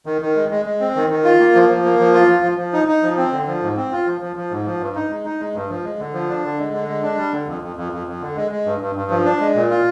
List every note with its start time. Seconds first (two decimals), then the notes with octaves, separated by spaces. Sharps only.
0.06 D#3
0.22 D#3
0.36 G#3
0.51 G#3
0.66 G#3
0.80 C4
0.96 D#3
1.10 D#3
1.24 F4
1.40 A#3
1.55 F3
1.69 F3
1.84 A#3
1.99 F3
2.14 F4
2.28 F3
2.43 F3
2.58 F3
2.73 D#4
2.88 D#4
3.03 F3
3.17 C4
3.32 D3
3.47 F3
3.63 G#2
3.77 C4
3.92 F4
4.06 F3
4.21 F3
4.36 F3
4.51 G#2
4.66 F3
4.80 G2
4.95 D#4
5.10 G#3
5.25 D#4
5.40 G#3
5.54 G2
5.69 F3
5.84 G#3
5.99 D3
6.13 F3
6.29 D4
6.44 D3
6.59 G#3
6.73 D3
6.88 G#3
7.03 D4
7.18 G3
7.32 D3
7.47 F2
7.62 F2
7.77 F2
7.92 F2
8.07 F2
8.21 D3
8.36 G#3
8.52 G#3
8.66 G2
8.81 G2
8.96 G2
9.10 F3
9.25 D4
9.40 G#3
9.55 A#2
9.70 F4